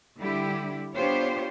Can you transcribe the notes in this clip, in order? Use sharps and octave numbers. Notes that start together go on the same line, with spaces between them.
D3 G3 E4 G4
B3 D4 F4 G4 C5 C#5